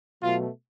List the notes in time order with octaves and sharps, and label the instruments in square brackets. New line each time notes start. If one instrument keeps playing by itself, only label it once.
[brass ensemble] B2 F#3 A3 F4